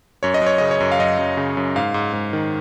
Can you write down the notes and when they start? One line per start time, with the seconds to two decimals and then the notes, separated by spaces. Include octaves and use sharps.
0.23 F#2 C#5
0.34 D#5
0.42 F#2 C#5
0.58 C#3 D#5
0.71 C#5
0.80 F#2
0.92 F5
0.99 F#2 D#5
1.19 F#2
1.37 C#3
1.57 F#2
1.76 G#2 F5
1.94 G#2
2.13 G#2
2.33 D#3